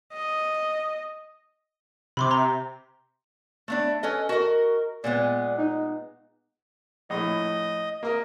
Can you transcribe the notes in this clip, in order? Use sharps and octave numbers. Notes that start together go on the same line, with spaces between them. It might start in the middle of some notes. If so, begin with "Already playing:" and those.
D#5
C3 B5 C6 D6
A#5 C6
A3 B3 D4
C#4 A4 B4 D#5
F#4 A#4 D#5
A#2 G#3 B3 D5
D#4
A#1 A2 D#5
A#3 A#4 D#5